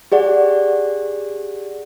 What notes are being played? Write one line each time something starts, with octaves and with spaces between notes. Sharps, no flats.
G4 G#4 D5 F#5